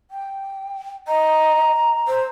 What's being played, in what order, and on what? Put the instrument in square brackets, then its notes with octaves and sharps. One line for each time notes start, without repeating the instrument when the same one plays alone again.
[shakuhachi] G5
[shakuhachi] D#5 [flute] A#5
[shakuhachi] C5